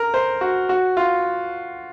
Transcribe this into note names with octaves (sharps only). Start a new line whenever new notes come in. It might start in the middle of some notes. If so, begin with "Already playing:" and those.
Already playing: A#4
C5
F#4
F#4
F4